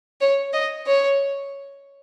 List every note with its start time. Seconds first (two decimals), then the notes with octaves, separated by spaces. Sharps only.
0.21 C#5
0.53 D#5
0.87 C#5